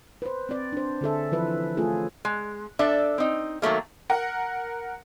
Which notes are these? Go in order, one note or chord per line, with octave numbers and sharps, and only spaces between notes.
B4 C5
C4 D5
D4 C5
D3 G#4 A4 E5
E3 F3 B4 E5
A3 C#4 F4 G#4 A4
G#3
D4 A4 E5
C4 D#4
D#3 F#3 A3 A#3
A#4 F#5